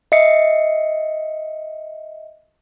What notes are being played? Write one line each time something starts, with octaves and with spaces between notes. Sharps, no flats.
D#5 E5 C7 C#7